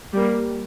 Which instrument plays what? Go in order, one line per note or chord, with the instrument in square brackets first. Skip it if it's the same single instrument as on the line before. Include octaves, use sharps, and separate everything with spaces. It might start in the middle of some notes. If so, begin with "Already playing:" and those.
[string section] G3 A#3